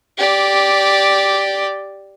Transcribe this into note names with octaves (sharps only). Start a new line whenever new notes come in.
G4 D5